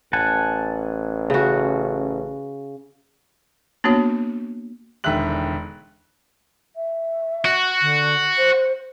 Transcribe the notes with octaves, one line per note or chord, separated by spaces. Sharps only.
A1 F#5 G#5 A5
C#3 F#4
A#3 B3 D4 F#4 C#5
E1 D3 D#3 E5 F#6 F#7
E5
F#4
D3
C5